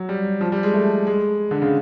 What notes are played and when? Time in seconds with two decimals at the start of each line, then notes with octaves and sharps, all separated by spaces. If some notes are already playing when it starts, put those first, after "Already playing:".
Already playing: F#3
0.09 G3
0.41 F3
0.52 G3
0.63 G#3
0.74 A3
1.07 G#3
1.51 D3
1.62 C#3